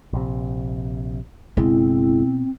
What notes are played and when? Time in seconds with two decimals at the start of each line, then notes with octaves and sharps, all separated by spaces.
0.13 A#1 C3
1.57 F#1 B2 G#3 C4 E4